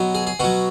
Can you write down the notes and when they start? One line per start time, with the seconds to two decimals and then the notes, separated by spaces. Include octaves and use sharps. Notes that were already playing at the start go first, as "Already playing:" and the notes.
Already playing: B2 F#3
0.15 G#4
0.27 G#4
0.40 B2 F#3 F#4